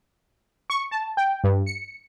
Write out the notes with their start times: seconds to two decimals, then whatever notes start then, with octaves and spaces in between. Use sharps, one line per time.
0.70 C#6
0.91 A5
1.17 G5
1.44 G2
1.66 C#7